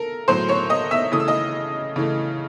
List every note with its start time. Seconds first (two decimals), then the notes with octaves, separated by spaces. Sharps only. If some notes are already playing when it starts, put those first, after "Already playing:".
Already playing: A4 A#4
0.28 A2 F#3 A3 C5 C6
0.49 C#5 C#6
0.70 D#5 D#6
0.91 E5 E6
1.12 C#3 E3 A3 D#6
1.20 E6
1.28 D#5 D#6
1.96 C#3 E3 A3